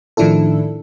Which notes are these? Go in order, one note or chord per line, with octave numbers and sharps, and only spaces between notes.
A2 D#3 F3 D4 E4 A4